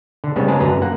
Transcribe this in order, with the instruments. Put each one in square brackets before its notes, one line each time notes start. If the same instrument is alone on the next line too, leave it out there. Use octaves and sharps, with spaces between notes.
[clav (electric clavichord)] D3
C#3 G3 G#3 B3 C4
C#3 G#3 G#4 A#4 B4 A5
F#2 D3 B4 A5 A#5
A#3 F#5